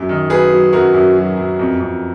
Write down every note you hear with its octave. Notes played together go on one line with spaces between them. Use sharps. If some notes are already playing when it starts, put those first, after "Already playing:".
Already playing: F#2
D#3
F#3 G#4 B4
F#3
F#2 F#4 A#4
F#2
F#3
F#2
F2
F2